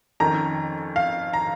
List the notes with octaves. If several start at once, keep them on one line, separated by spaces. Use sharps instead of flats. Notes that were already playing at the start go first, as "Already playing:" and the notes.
F2 D#3 C#4 A#5
F5
A#5